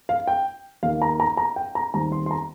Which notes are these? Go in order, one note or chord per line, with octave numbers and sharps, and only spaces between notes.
F5
G5
D#2 D#3 A#3 F5
A#5
A#5
A#5
G5
A#5
D#2 D#3 G3 C4 A#5
C6
C6
A#5